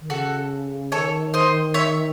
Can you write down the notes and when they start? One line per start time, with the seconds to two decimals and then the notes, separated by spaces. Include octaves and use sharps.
0.01 D#3
0.10 C#3 F#4 A4
0.92 D#3 A4 C#5
1.34 C5 D#5
1.74 C#5 E5